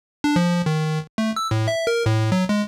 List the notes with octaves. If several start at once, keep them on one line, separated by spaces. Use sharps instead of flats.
D4
F3
D#3
A3
E6
A2
E5
A#4
A2
F#3
G#3